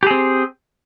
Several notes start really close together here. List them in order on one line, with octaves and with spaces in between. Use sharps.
G4 G#4 C4